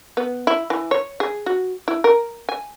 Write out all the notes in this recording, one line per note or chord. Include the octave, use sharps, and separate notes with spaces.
B3
E4
E3
C#5
G#4
F#4
E4
A#4
G#5